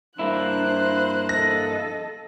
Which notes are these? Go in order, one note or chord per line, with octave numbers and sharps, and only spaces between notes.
G2 A#3 D4 E4 C5 F#6
A4 D#5 A#6